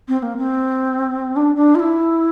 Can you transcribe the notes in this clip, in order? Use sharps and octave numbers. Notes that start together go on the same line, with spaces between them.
C4
C4
A#3
C4
D4
D4
F4
E4